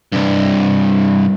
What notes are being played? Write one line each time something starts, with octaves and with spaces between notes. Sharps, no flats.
C2 G2